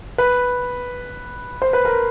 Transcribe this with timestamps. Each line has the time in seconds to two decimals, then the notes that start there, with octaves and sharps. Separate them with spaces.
0.18 B4
1.62 C5
1.73 B4
1.85 A#4